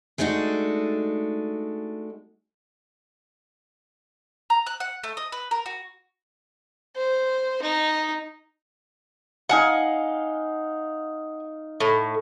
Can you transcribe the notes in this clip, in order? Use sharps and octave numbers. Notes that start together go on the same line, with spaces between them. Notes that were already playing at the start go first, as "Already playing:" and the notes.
G#3 A3 D4 D#4 F#4
A#5
F#6
F#5
A3
D#5
B4
A#4
F#4
C5
D#4
D#4 F5 F#5 G#5
A2